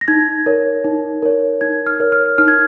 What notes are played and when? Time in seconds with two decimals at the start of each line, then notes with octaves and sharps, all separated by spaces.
0.01 A#6
0.08 D#4 G#6
0.46 A#4 C#5
0.84 D#4
1.22 A#4 C#5
1.61 D#4 G#6
1.86 F6
2.00 A#4 C#5
2.12 F6
2.38 D#4 F6
2.48 G#6